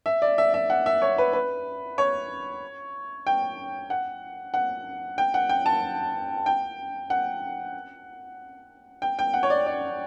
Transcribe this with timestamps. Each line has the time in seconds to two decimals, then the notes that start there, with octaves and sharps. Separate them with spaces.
0.06 E5
0.22 D5
0.38 E5
0.54 E5
0.70 F#5
0.86 E5
1.02 C#5
1.18 B4
1.33 B4
1.98 C#5
3.27 G5
3.90 F#5
4.54 F#5
5.18 G5
5.34 F#5
5.49 G5
5.66 A5
6.46 G5
7.10 F#5
9.02 G5
9.19 G5
9.34 F#5
9.43 C#5
9.50 D5
9.66 D5